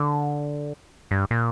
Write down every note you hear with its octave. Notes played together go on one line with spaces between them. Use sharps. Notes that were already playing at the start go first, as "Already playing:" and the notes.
Already playing: D3
G2
A#2